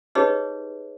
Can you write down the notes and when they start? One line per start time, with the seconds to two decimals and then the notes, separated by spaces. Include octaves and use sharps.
0.15 D#4 G4 G#4 B4 C#5 D#5